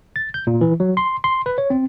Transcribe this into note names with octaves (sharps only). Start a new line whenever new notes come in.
A6
G6
A#2
E3
F#3
C6
C6
B4
C#5
C4